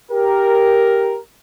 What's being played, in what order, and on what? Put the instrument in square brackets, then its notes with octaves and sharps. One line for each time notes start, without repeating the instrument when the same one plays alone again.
[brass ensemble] G4 A#4